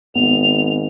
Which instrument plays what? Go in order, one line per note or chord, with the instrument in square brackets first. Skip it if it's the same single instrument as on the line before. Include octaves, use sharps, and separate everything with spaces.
[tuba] G#1 [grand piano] B3 [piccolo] F7